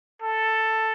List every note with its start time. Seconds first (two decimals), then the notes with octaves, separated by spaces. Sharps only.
0.22 A4